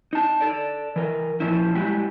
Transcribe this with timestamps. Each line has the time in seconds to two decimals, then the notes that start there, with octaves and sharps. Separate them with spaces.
0.13 D#4 A5
0.41 A4 D5
0.96 E3 A#4
1.40 A#2 C#3 F3 C#4 E4
1.75 G3 G#3 E4 F#4 G4